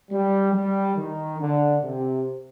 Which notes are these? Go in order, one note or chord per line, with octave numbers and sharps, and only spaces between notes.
G3
G3
D#3
D3
C3